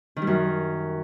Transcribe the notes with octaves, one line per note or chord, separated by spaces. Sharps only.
D#3
G3
F#2